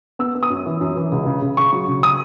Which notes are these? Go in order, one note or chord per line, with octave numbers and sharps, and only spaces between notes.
B3 E6
B3
D#6
F#2
E3
F#2
E3
C#2
C#3
C#3
C#3 C#6
F#3
C#3
D#6